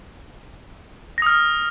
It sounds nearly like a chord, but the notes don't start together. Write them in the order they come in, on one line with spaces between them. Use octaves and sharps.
A#6 D#6 F6